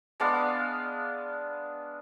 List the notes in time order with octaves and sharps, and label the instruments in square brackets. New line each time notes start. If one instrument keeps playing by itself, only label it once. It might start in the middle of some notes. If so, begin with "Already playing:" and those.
[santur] G#3 B3 D4 F5